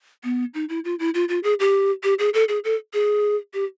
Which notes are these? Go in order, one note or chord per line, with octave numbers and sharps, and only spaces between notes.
B3
D#4
E4
F4
E4
F4
F4
G#4
G4
G4
G#4
A4
G#4
A4
G#4
G4